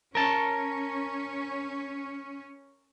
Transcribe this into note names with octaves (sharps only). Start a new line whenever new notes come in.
C#4 A#4 A5